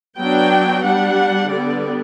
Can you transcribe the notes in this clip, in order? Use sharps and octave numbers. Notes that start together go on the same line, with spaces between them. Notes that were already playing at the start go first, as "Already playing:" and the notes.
F#3 B3 D4 G5
G3 D4 F#5
D3 G3 B3 D5